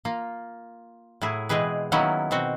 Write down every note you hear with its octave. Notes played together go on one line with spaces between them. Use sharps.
A#3 F4
A2 F#3 E4 G#4
B2 E3 G#3 C4 G#4 B4
D#3 F#3 A#3 B3 C#4 E4
B2 C4 F#4